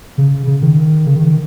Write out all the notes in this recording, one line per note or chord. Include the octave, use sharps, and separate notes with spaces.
C#3
C#3
D#3
C#3
D#3
D#3